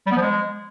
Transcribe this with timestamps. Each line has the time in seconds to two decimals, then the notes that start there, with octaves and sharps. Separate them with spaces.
0.06 G3
0.12 B3
0.17 F3
0.22 G#3